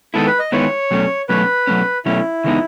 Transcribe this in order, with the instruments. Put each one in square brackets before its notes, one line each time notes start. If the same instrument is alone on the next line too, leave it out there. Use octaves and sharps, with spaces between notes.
[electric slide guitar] D#3 G#3 B3 E4 [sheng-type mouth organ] A4
[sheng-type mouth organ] B4
D#5
[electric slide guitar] D#3 G#3 B3 E4 [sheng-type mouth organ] C#5
[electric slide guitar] B2 F#3 A3 C#4
[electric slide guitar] B2 F#3 A3 C#4 [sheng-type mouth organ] B4
[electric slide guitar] B2 F#3 A3 C#4
[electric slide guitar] B2 F#3 A3 C#4 [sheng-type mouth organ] E4
[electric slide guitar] C#3 E3 G#3 B3 D#4